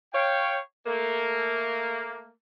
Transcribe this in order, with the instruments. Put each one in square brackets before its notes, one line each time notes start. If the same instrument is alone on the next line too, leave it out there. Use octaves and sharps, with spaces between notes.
[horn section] C#5 F5 G5
A3 A#3